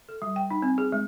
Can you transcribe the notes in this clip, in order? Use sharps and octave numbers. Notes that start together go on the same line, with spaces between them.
A4
G3
G5
D#4
C4
G#4
G#3